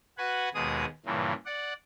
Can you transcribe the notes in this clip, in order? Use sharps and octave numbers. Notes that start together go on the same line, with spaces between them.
F#4 B4 F#5 G#5
D#2 B2 G#3 G#4 D#6
G2 A#2 C#3 E3
D5 F#5